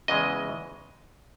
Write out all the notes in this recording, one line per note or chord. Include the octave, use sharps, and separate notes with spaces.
E2 C#3 E3 G#3 D#5